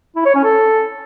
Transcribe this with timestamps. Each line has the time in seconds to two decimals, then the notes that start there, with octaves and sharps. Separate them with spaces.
0.16 E4
0.25 C#5
0.35 C#4
0.44 A4